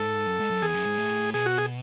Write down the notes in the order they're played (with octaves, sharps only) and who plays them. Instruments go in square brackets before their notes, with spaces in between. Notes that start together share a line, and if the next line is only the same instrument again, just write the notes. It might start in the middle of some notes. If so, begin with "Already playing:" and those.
Already playing: [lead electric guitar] G#2 [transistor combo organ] A4
[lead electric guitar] F#2
G#2
F#2
[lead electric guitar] E2 [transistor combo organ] G#4
[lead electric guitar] F#2
G#2
A2
[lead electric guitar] B2 [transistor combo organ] G#4
[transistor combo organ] F#4
G#4